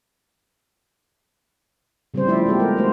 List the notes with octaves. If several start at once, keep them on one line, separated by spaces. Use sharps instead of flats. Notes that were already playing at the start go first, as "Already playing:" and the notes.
C#3 G3 C4 D4 C5
F3 A3 E4 D5 E5
G#3 A3 B3 G4 A4
A#4
G#3 A3 D#4 F#4 C5